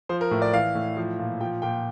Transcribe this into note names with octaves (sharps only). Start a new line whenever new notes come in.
F3 C5
A#4
A2
D5
E3 F5
A2
F3
A#2
F3 G5
A#2 G5